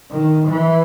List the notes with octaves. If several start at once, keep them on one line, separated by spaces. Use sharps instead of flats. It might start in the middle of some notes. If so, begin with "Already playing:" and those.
D#3
E3